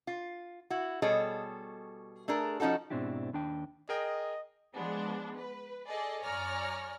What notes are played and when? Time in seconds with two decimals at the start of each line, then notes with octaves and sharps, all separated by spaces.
0.07 F4
0.70 E4 F#4
1.02 B2 G3 G#4 A4 C#5 D#5
2.28 A3 D4 G#4 A#4
2.60 F3 C#4 D#4 F#4 A4
2.90 G#2 B2 C4 D4 E4 G4
3.33 D#2 D4 G5
3.89 G#4 A#4 D#5 G5
4.75 F3 G#3 B3 D4
5.37 B4
5.88 G#4 A4 D5 D#5
6.24 F#2 C#5 D5 G#5 A#5 F6